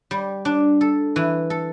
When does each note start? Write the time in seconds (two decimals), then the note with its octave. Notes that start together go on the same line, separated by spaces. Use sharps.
0.11 G3
0.45 D4
0.81 A4
1.16 E3
1.50 A4